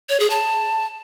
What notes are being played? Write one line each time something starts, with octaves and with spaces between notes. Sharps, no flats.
C#5
G#4
A5